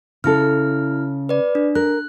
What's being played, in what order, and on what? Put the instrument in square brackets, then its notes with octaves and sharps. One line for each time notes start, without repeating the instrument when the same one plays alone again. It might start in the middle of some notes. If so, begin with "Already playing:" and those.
[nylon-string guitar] C#3 A4 [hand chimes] E4 F6
[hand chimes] B4 D5
D4
[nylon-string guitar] A#4 [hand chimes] F#6